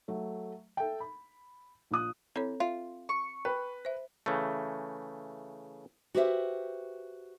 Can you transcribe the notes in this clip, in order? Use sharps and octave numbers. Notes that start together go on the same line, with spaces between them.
F#3 A3
A4 E5 G5
B5
A#1 F4 D#6 F#6
E3 C4 A4 C#5
F4 E5
C#6
B4 G5
C5 E5
C#3 E3 A3
F#4 G4 B4 C5 D#5 E5